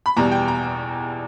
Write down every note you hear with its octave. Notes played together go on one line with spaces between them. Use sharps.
B5
E2 B2 G3 A#5
G5
A#5